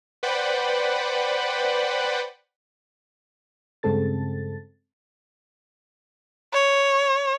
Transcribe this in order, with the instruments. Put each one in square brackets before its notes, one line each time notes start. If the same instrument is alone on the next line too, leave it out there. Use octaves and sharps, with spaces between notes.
[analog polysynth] B4 C5 D5 F#5 G5 B5
[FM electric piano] G2 C#3 G#3 C4 A4 A6
[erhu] C#5